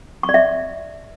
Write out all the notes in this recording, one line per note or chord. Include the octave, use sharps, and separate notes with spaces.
C#6
D5
E5